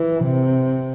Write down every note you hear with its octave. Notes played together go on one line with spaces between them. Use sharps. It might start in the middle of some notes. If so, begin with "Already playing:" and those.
Already playing: E3
C3